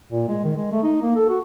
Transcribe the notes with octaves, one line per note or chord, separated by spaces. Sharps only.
A#2
G#3
D#3
G#3
A3
D#4
A#3
A4
F#4